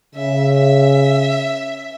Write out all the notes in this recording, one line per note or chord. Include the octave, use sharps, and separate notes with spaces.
C#3 E5
E5